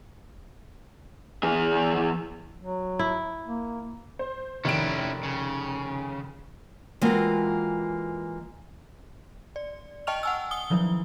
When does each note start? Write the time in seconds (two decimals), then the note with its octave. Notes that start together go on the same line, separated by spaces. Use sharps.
1.43 E2 G#4
2.59 F#3
2.99 E4
3.46 A#3
4.19 C5
4.65 F1 D#3 C#4 E4 D7
5.23 C#3
7.01 E3 G#3 A#3 C4 F4 F#4
9.56 D5
10.07 D#5 G5 A5 C#6 F6 F7
10.23 F#5 G#5 E6
10.51 D#6 G7
10.70 D#3 F3 F#3 E4